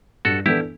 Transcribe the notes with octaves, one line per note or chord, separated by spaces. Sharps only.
G2 F#4 A4
E3 B3 D4 E4 G4 A4